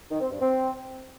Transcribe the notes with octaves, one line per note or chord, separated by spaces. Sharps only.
D#3
C4
G2
C4